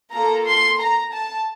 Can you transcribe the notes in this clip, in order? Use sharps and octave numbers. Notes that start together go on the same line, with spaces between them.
A#3 F4 A4 A#5
C6
A#5
A5